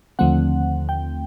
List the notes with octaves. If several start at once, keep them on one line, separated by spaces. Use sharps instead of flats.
D#2 D3 F3 A3 C4 F#5
G5